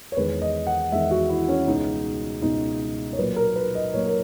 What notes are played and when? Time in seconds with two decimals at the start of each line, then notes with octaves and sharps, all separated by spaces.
0.12 C#5
0.17 E2 D#3 G#3 B4
0.42 D#5
0.67 F#5
0.92 E2 D#3 G#3 E5
1.11 F#4
1.30 E4
1.49 C#4
1.67 C#2 B2 G#3 D#4
2.42 C#2 B2 G#3 D#4
3.13 C#5
3.18 A#2 F#3 A#3 B4
3.36 A#4
3.56 B4
3.75 D#5
3.94 A#2 F#3 A#3 C#5
4.07 A#4